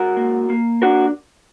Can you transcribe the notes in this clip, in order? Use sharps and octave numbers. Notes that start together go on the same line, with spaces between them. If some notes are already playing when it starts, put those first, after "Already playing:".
Already playing: G#2 F#4 A#4
A#3
A#3
D4 F#4 A#4